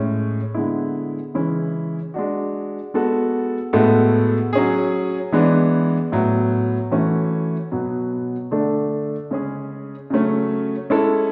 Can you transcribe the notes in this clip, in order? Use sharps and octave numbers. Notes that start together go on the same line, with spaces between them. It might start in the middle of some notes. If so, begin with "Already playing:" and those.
Already playing: A2 G#3 C#4
D3 G#3 B3 E4
C#3 E3 G#3 C#4 E4
G#3 D4 F#4
G#3 B3 F#4 A4
A2 G#3 B3 F#4 A4
F#3 C#4 G#4
E3 G#3 B3 D4
A2 F#3 B3
E3 A3 C#4 F#4
B2 F#3 B3
D3 A3 D4 A4
C#3 G#3 C#4 G#4
C#3 F#3 A3 C#4
G#3 C#4 E4 A4